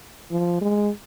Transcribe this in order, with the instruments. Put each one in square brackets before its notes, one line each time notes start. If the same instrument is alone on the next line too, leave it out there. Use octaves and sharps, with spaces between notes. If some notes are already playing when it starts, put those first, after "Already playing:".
[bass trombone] F3
G#3